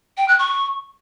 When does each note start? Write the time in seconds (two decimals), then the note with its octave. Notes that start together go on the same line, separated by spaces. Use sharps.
0.17 G5
0.28 F#6
0.39 C#6